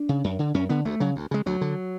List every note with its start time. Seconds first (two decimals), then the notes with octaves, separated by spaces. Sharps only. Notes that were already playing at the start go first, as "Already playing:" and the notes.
Already playing: D4
0.09 C#3
0.24 F#2
0.39 D3
0.54 F#2 C#4
0.69 D3 B3
0.85 D2 A3
1.00 C#3 F#3
1.16 D2
1.31 C#3 G#3
1.46 D2 F#3
1.61 D3